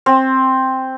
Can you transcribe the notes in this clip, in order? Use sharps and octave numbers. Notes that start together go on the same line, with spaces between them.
C4